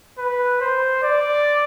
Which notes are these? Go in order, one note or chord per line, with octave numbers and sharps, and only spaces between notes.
B4
C5
D5